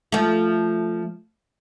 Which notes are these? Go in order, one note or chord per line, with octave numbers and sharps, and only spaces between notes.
F3 A3